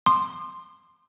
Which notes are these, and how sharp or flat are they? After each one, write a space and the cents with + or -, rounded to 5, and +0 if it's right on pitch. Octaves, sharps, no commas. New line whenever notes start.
C6 +0 D#6 -45